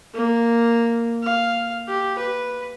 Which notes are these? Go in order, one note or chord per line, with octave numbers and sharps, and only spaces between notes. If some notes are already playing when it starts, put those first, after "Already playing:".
A#3
F5
G4
B4